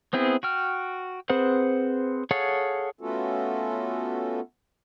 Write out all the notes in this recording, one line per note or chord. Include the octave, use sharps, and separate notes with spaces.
B3 C4 E4 G#4
F#4 G5 F6
C4 G#4 B4 C5 F#5
G#4 A4 C#5 F5 F#5
A3 B3 C#4 F4 F#4 A4